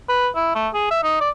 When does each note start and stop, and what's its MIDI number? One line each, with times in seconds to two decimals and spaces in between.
0.09 0.29 71
0.36 0.50 64
0.55 0.69 57
0.74 0.90 68
0.91 0.99 76
1.03 1.16 63
1.21 1.30 74